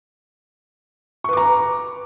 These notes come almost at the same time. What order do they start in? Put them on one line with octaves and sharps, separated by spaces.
C#6 B4 D6 A#5